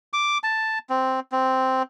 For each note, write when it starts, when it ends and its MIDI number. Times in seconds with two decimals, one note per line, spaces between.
0.13 0.38 86
0.44 0.79 81
0.90 1.20 60
1.32 1.83 60